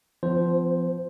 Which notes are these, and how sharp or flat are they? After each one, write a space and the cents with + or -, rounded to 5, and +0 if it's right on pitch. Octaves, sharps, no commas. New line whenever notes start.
F3 -20 B3 +45 C5 +0